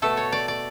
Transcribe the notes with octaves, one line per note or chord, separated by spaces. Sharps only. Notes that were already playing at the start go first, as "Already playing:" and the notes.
B2 A3 A4
C#5
D5
D5